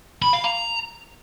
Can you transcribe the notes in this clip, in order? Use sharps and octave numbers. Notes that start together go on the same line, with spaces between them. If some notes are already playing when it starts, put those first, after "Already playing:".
B5
F5
A#5